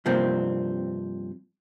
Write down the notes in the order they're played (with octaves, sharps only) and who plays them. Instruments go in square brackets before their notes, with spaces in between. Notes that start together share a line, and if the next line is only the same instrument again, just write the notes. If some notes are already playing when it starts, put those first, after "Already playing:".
[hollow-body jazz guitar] G2 C3 F3 A#3 C4